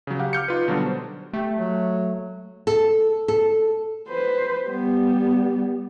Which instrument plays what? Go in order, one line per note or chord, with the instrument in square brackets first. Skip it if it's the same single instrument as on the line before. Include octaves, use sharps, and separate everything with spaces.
[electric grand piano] C#3 F#3
G4 F5 F#5
D6 F6 G6 C#7
D#4 F4 B4
B2 D3 F#3 G3 D4
C5
[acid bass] A3 [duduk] G4
[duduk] F#3
[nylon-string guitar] A4
A4
[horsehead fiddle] B4 C5
G3 B3